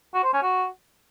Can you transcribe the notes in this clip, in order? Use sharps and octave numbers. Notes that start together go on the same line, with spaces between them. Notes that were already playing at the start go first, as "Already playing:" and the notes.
F#4
C5
C#4
F#4